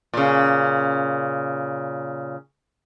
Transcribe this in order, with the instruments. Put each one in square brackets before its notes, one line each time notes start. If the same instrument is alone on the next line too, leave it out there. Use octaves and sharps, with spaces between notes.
[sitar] A#2 C#3